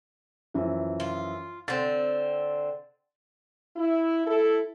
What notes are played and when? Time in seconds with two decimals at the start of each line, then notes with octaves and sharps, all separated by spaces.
0.54 F#2 E3 F3
1.00 F4
1.68 D3 C4 A6
3.76 E4
4.26 E4 A4